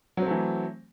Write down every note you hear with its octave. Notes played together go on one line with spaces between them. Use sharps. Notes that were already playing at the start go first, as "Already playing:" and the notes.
E3 F#3 A3 C4